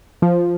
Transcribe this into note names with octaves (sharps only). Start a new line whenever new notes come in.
F3